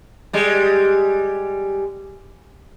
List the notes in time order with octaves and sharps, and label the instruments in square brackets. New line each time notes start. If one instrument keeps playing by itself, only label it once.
[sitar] G3 G#3